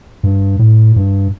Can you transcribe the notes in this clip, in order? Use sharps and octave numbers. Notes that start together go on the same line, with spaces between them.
G2
A2
G2